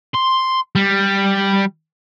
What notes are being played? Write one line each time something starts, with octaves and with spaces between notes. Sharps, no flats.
C6
G3